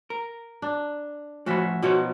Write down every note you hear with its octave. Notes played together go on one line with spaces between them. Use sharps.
A#4
D4
A2 F3 C#4 F#4 E5 B5
B1 B2 F3 F#4 C#5